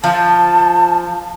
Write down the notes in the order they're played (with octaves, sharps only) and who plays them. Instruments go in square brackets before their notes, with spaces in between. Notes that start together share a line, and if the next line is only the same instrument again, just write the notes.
[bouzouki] F3 [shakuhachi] A5